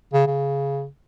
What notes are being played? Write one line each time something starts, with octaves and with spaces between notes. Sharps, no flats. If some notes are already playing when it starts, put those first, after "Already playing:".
C#3
C#3